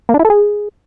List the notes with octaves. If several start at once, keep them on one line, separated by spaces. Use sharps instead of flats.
A#3
D4
E4
A4
G#4